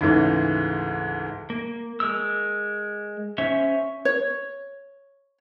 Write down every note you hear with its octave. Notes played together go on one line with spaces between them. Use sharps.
D2 G#2 C#3 E3
A#3
G#3 A#4 E6
C#4 C5 C#5 E5
C#5